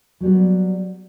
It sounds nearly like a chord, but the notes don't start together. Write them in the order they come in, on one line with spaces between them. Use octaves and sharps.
F#3 G3 B3